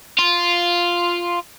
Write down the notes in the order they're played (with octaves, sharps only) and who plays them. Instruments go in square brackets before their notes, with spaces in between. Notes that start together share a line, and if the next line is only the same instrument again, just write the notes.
[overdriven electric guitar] F4